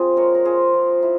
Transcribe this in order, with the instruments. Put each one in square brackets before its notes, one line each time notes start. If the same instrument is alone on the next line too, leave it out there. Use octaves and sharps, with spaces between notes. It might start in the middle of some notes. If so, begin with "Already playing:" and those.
Already playing: [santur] F3 C4 F4 G#4
G#3 A#4 C#5
A#4
F4 G#4 C5
F3
E4